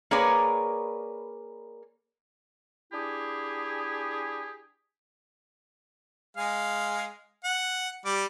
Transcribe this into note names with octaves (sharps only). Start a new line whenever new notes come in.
A#3 G#4 A#4 B4 C#5 D5
D4 E4 G4 G#4
G#3 G#4 F5
F#5
G3 D6